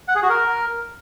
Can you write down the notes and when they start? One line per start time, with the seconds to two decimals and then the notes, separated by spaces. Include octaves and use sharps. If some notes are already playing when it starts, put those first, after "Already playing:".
0.08 F#5
0.15 G#4
0.23 F#4
0.30 A#4